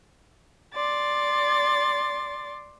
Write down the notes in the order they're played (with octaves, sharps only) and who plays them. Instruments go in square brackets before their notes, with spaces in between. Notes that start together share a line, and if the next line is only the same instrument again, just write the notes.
[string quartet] D5 C6 A6